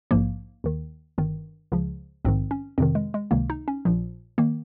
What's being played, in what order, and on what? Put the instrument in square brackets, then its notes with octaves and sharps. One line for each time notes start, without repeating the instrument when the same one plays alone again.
[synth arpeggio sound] A#1 G#2 F3 A#3
D#2 D#3
G1 G2 D#3
C#2 C#3 F3
A#1 G#2 D#3 C4
C#4
F2 C3 D#3 C4
G#3
G#3
C#2 C3 D#3 A#3
D#4
C#4
A#1 A#2 F3
D#3 A#3